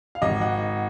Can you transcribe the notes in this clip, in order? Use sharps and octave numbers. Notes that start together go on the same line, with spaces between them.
F5
G#1 D#5
F#5